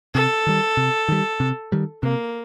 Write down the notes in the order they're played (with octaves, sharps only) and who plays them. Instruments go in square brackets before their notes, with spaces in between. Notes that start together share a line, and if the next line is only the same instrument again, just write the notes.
[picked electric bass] C3 [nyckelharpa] A4
[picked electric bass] D#3 G3
C3
D#3 G3
C3
D#3 G3
[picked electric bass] C3 [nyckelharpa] A#3